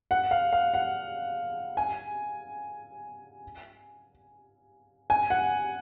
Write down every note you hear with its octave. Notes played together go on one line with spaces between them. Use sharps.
F#5
F5
F5
F#5
G#5
G#5
F#5